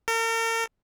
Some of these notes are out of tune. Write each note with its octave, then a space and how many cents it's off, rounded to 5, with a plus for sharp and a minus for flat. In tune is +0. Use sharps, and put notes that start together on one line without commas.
A#4 -40